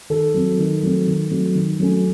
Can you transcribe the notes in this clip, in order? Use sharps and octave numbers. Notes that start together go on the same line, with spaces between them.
D#3 A4
F#3 C4
D#3
F#3 A3 C4
D#3
F#3 A3 C4
D#3
F#3 A3 C#4